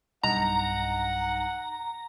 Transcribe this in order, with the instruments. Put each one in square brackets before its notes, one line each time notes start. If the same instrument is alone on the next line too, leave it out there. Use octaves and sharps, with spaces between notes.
[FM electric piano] B1 G2 D#4 [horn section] F#5 [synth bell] A#5